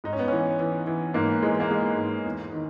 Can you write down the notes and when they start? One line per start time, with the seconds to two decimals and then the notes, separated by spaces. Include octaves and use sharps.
0.04 G#2 D#4
0.13 C#4
0.19 B3
0.28 E3 C#4
0.60 E3
0.87 E3
1.14 G#2 A#3
1.43 E3 G#3
1.60 A#3
1.70 E3 G#3
1.97 G#2
2.25 E2
2.53 D#3